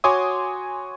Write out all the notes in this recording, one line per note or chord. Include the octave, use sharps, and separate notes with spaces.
F#4 C#5 G#5 C6 D6 D#6